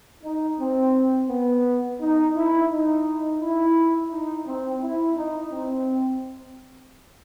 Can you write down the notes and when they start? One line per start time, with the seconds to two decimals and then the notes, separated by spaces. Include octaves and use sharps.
0.23 D#4
0.59 C4
1.30 B3
2.00 D#4
2.35 E4
2.71 D#4
3.41 E4
4.11 D#4
4.47 C4
4.83 E4
5.17 D#4
5.52 C4